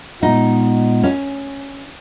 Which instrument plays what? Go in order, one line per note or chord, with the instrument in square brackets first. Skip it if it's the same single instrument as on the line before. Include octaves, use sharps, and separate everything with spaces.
[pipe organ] A#2 G#3 B3 [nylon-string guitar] D#4
[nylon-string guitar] C#4